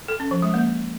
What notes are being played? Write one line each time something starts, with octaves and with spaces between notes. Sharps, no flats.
A4
C#4
F3
G#3
A#3